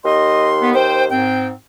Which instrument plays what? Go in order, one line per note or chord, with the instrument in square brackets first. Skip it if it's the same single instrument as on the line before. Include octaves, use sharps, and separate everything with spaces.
[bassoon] D#2 [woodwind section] D#5 [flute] C6
[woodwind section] B3
[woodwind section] C5 [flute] G5
[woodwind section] G#2 C4 [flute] G5